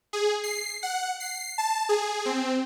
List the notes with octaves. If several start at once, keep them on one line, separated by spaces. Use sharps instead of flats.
G#4
C7
F#5
C7
A5
G#4
C4